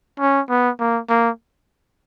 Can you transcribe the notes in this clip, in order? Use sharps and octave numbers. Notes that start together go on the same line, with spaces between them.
C#4
B3
A#3
A#3